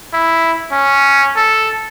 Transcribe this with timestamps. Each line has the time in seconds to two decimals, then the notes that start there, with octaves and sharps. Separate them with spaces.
0.13 E4
0.72 C#4
1.37 A4